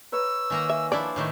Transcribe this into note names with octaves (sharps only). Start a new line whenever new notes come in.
B4 C#5 A#5 E6
D#3 A#3 G#5 A#5
E5
F3 D4 E4 D5
A2 D#3 A3